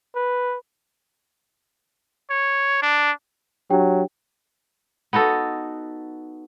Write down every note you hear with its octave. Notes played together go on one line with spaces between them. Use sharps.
B4
C#5
D4
F#3 D4 G4 G5
B3 D#4 F#4 A4